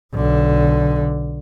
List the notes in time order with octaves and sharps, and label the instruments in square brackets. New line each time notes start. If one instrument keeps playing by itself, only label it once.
[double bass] B1 D3